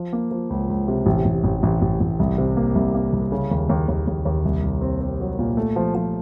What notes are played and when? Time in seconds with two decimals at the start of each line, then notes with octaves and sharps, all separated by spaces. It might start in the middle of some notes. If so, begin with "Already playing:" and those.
Already playing: F3
0.13 A#3
0.31 F3
0.50 C#2
0.69 C#2
0.88 C3
1.06 A1
1.25 A1
1.44 A1
1.63 A1
1.82 A1
2.00 A1
2.19 C2
2.38 C3
2.57 A#3
2.75 C2
2.95 A#3
3.13 C2
3.32 C#3
3.51 D#2
3.70 D#2
3.88 D#2
4.07 D#2
4.25 D#2
4.45 C2
4.63 C2
4.81 C4
5.01 C4
5.20 F#3
5.39 A#2
5.57 A3
5.76 F3
5.95 F3